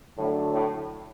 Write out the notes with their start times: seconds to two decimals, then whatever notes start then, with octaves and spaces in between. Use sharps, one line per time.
0.16 A2 D3 F#3 A3 D4
0.52 A2